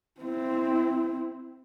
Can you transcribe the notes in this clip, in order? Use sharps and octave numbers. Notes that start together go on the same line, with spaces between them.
C4 E4